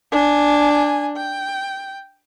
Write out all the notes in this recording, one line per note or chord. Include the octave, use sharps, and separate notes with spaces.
D4 G#5
G5